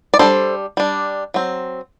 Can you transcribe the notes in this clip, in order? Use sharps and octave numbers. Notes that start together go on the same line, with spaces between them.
D5
G3 D4 A4 C5
G3 D4
F#3 C4